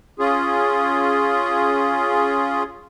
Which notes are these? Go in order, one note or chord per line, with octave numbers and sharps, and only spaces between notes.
C#4 F4 G#4